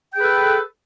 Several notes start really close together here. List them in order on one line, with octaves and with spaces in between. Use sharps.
G5 G#4 B4 A4